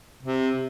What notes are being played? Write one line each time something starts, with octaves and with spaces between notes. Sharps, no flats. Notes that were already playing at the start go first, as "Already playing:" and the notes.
C3